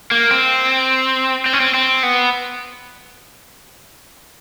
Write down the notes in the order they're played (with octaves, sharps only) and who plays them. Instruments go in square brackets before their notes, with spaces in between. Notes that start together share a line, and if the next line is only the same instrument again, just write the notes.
[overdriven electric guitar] A#3
C4
C4
C#4
C4
C4
B3